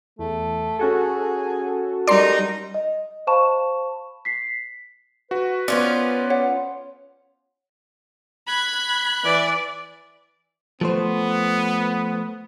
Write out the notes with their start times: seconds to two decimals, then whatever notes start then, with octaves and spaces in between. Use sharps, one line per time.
0.19 E2 A3
0.79 C#4 F#4 G#4 A4
2.07 G3 D#4 A#4 D5 A#5 C6
2.74 D#5
3.27 C5 F5 A5 B5 C#6 E7
4.25 B6 C7
5.31 F#4 B4
5.68 B3 C#4 F4 C5 D5
6.30 C#5 F#5
8.47 B5 F#6 G#6
9.24 E3 D5
10.81 F3 A3 B3 C5